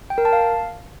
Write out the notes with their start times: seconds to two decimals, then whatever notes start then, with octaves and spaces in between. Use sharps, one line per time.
0.10 G5
0.18 A#4
0.25 A5
0.33 F5